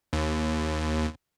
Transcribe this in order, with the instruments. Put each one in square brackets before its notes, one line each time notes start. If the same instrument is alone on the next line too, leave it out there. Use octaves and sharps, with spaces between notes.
[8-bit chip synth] D#2